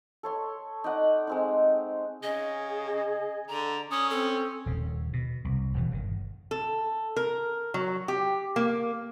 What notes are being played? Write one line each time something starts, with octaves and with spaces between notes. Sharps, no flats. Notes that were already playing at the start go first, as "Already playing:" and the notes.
A4 C#5 C6
D#4 D5 F#5
G#3 C4 D#4
C#3 G#4 D#5
D3 A#5
C#4 D#6
C4 A4
D#1 C#3
B2
C2
D#1 B2 E3
G1 B2 D#3
A4
A#4
F#3
G4
A#3